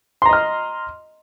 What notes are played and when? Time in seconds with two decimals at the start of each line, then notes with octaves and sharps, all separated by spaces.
0.22 C6
0.25 A#5
0.29 D#5
0.33 F6